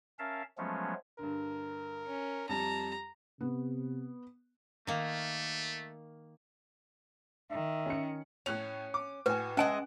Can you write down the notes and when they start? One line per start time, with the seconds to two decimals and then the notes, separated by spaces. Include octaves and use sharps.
0.19 C#4 A#4 E5 F5 A5
0.58 F3 F#3 G#3 A3 B3 C#4
1.19 G2 D3 A#4
2.07 C#4
2.49 F2 G3 A5 A#5
3.41 C3 B3
4.87 D#3 A3 A#3
7.51 D#3 E5
7.86 C#4 C#7
8.46 A2 C#4 F#6 F7
8.94 D6
9.26 A2 F#4 B4 G#5
9.57 G#3 C#4 D#5 E5 F#5 G#5 A5 F#6